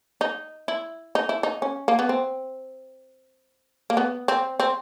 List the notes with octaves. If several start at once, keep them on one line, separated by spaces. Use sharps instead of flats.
D#4
E4
D#4
E4
D#4
C#4
A#3
B3
C4
A#3
B3
C4
C4